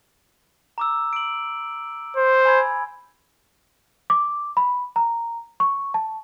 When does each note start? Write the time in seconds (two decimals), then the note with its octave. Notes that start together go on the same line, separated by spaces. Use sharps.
0.78 A#5 D6 E6
1.13 D7 F#7
2.17 C5
2.45 G#5 B5 G#6
4.10 D6
4.57 B5
4.96 A#5
5.60 C#6
5.94 A5